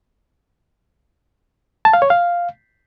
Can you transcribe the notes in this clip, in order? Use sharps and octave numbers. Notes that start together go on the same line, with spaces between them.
A5
F5
C#5
F5